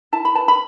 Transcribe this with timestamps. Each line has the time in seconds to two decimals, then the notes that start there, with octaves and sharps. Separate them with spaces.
0.12 E4 A5
0.25 B5
0.34 B4 A5
0.48 B5